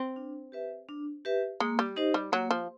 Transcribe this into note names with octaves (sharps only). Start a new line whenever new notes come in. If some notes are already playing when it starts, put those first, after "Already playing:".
Already playing: C4
D4
G4 B4 E5
D4
G4 B4 E5
G#3 A#3
G3
D#4 G4 C5 D#5
G3
F#3 A#3
F3